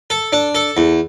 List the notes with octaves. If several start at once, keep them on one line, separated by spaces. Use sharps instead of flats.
A4
D4
A4
E2